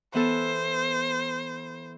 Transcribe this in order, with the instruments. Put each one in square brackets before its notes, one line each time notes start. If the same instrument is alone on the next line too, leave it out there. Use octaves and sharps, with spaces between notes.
[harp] E3 B3 A4 [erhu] C5